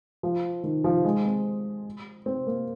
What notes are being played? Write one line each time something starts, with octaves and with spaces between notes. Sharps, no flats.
F3
D#3
F3
G#3
C4
C4
A#3